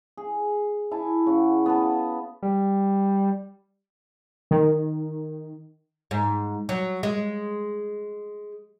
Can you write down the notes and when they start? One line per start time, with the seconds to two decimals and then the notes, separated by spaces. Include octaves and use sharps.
0.17 G#4
0.91 E4 G#5 A5
1.27 C#3 F#4
1.66 B3 B4 F5 A5
2.43 G3
4.51 D#3
6.11 G#2
6.69 F#3
7.03 G#3